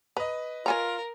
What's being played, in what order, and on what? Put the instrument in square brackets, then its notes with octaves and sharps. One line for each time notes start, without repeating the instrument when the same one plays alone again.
[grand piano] B4 D#5 [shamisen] A#5
[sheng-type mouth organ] F4 [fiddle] A#4 [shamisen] C#5 G#5 A#5